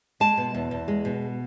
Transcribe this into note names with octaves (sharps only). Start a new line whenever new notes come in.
G#3 A5
B2
E2
E2
G#3
B2